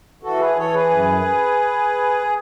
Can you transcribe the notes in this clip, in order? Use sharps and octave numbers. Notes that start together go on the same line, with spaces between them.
E3 F#4 A4
G#4 B4
E3 A4 C#5
G#4 B4
F#2